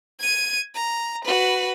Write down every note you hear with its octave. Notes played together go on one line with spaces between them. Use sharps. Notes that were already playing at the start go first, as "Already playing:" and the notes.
G#6 D#7
A#5
F#4 B4